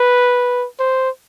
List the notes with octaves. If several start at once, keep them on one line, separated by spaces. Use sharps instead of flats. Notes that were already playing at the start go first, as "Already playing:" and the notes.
Already playing: B4
C5